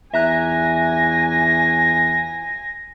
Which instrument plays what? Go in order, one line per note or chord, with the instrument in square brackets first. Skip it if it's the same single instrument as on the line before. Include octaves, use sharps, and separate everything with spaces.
[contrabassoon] E2 [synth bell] E5 A#5 F#6 [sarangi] G#5 [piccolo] A#6